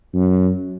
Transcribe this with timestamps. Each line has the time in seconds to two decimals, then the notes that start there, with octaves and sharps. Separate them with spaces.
0.14 F#2